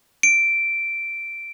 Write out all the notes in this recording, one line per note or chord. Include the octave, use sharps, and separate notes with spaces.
D7